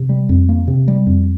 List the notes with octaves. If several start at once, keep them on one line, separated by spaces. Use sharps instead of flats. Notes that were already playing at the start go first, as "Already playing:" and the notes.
Already playing: C3
G3
F2
A#3
C3
G3
F2